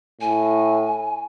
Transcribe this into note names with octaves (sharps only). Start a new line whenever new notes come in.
A2 G#5